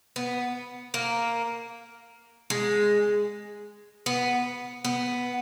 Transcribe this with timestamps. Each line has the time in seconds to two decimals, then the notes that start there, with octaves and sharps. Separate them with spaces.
0.16 B3
0.94 A#3
2.50 G#3
4.06 B3
4.85 B3